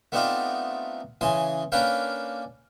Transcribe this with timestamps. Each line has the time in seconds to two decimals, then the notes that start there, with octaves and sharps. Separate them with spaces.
0.12 A3 B3 C4 D4 D#4 F4
1.21 C#3 E3 G#5 C6 D#6
1.72 A#3 C#4 D4 B4 F5 G5